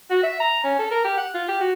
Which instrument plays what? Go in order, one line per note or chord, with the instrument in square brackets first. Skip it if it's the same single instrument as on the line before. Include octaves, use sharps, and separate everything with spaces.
[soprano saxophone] F#4
E5
A#5
C#4
A4
A#4
G4
F#5
F4
G4
F#4